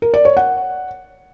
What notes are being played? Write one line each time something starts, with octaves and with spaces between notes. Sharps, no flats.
A#4
D5
C#5
F#5